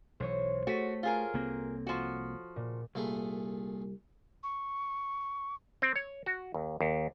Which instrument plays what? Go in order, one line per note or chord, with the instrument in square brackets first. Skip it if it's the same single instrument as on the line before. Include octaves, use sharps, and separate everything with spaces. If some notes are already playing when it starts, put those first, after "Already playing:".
[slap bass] B1 E3 [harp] C5 C#5 C#6
[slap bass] A3 [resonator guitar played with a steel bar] F#4 [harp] A4 B6 D#7
[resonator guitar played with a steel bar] F4 G#4 A#4
[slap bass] C2 A#3 C4
[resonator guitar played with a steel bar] F3 F#4
[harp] A#2
[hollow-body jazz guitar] C2 [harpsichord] A#2 A3 G#4
[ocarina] C#6
[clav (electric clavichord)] C4
C#5
F#4
D#2
D#2